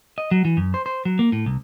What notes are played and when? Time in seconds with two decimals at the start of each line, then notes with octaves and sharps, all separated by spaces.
0.18 D#5
0.31 F#3
0.45 E3
0.57 F#2
0.74 C5
0.86 C5
1.05 F#3
1.19 A#3
1.32 A2
1.46 C2